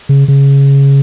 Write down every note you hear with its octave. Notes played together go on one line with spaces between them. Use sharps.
C#3
C#3